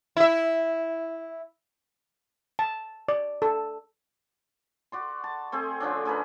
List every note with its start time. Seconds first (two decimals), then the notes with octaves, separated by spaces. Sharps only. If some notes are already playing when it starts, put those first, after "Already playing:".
0.17 E4 E5
2.59 A5
3.08 D5
3.42 A4
4.92 F#4 D5 C6
5.24 A5
5.52 A3 C4 G#4
5.80 D3 F3 C#4 D4
6.05 A3 G#4 A#4 B4